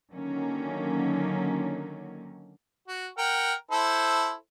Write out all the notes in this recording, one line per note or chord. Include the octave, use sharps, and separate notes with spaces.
D3 D#3 F#3 A#3 C#4
F#4
A#4 F#5 G5
E4 A4 C5